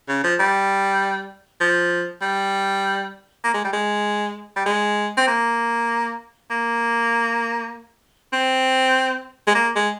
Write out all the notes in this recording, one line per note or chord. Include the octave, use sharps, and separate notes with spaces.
C#3
F3
G3
F3
G3
A#3
G#3
G3
G#3
G3
G#3
C4
A#3
A#3
C4
G#3
A#3
G#3